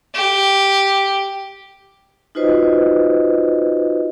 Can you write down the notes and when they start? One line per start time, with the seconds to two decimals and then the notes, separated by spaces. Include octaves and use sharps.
0.15 G4
2.35 D#4 F4 F#4 B4 C5 D#5